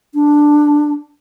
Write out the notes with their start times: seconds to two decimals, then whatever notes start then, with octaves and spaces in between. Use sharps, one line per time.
0.14 D4